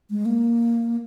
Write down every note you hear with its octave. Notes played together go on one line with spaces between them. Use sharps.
G#3
A#3